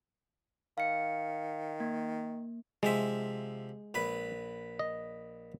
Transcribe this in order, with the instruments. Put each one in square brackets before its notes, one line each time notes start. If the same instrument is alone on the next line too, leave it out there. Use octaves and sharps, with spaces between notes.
[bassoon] D#3 [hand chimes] F5 C#7
[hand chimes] A#3
[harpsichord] C3 F3 E5 [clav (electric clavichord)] G#3
[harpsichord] A#1 B4 B5
[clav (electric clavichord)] D#5